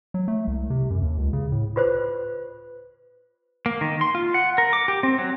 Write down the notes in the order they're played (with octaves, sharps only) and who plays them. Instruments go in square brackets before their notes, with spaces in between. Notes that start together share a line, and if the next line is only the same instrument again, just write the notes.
[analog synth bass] F#3
A3
C2
C3
F#2
D#2
C#2
C#3
A2
[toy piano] F4 B4 C5
[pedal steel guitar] A#3
D#3
C6
F4
F#5
A#4
D6
G4
C4
F#3